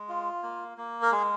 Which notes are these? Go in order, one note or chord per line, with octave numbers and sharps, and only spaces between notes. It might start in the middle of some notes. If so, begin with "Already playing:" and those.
Already playing: G#3
F4
A#3
A#3
A#4
G#3 G#4